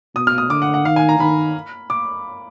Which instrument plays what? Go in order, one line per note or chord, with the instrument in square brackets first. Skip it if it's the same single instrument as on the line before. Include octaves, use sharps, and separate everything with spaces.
[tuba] B2 [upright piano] D#6
[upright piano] F6
D#6
[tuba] D3 [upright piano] D6
[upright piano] F#5
F#5
[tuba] D#3 [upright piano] F5
[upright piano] G#5
A#5
[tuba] D#3 [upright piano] B5
[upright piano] D6